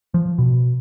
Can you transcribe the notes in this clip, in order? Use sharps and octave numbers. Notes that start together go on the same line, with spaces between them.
F3
B2